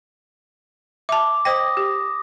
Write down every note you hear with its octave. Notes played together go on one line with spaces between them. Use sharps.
E5 A5 D6
C5 D#5 G5 D#6 A#6
G4